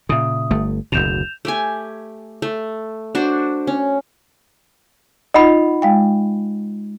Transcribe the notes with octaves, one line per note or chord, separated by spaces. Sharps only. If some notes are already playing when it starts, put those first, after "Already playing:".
A#2 C#3 E5 D#6
G1 A3
F#1 D2 B2 G6 E7 F7
A3 G4 G#5
A3
D4 F#4 C5
C#4
D#4 F4 D#5 F#5 B5
G#3 F5 G5